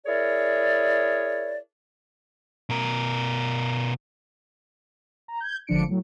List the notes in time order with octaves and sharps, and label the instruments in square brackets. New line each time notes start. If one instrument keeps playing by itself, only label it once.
[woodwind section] E4 G#4 A#4 C#5 D5
[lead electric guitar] B2 A#4
[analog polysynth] A#5
G6 G#6
G#1 D3 F3 D4 C#7 D7
A2 F#3